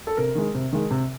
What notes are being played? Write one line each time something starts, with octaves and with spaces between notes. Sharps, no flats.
A4
C3 A#4
D#3 G#3
C3
D#3 G#3
C3